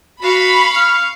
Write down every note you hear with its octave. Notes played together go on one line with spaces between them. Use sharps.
F#4 F5 B5 C#6
F6